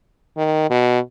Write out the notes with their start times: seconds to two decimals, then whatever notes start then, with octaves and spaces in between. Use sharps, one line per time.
0.37 D#3
0.70 B2